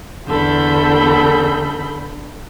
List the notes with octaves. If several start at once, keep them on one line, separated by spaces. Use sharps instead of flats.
E2 D3 A4 B5 G6